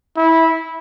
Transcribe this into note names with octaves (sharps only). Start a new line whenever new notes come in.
E4